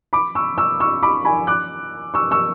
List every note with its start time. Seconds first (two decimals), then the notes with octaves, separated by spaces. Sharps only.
0.13 B5 D6
0.35 C#6 E6
0.57 C#6 E6
0.80 C#6 E6
1.02 B5 D6
1.25 G#5 B5
1.47 D6 F#6
2.14 C#6 E6
2.31 C#6 E6